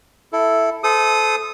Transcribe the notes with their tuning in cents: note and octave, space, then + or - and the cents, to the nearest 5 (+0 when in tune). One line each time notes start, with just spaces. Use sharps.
E4 +0 A4 +0
A4 -20 C5 -25 D#6 +0